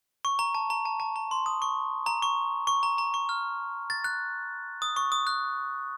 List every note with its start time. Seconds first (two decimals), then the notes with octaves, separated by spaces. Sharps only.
0.25 C#6
0.39 A#5
0.55 A5
0.70 A#5
0.85 A5
1.00 A5
1.16 A#5
1.31 C6
1.46 D#6
1.62 C#6
2.06 A#5
2.22 C#6
2.67 C#6
2.83 A#5
2.98 A#5
3.14 C#6
3.29 F6
3.90 A6
4.04 F#6
4.82 D#6
4.96 C#6
5.12 D#6
5.27 F#6